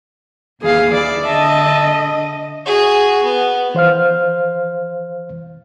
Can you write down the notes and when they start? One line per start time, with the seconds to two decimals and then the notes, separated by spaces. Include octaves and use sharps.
0.61 D#2 E3 G#4 F5
0.93 E4 D5
1.25 D3 D#5 E5 A5
2.66 F#4 G#4
3.23 B3
3.75 E3 C5 F5 F6